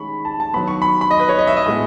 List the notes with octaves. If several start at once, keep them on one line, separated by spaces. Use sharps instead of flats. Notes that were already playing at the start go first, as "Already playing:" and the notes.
Already playing: D#3 G#3 C#4 B5 C#6
A5
A5
D#3 F#3 B3 B5
C#6
B5
B5
D#5
B4
C#5
D#5
E5
D#5
A2 G#3 B3